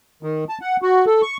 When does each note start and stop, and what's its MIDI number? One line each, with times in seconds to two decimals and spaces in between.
0.23 0.44 51
0.49 0.58 81
0.61 0.76 78
0.82 1.05 66
1.06 1.22 69
1.22 1.37 85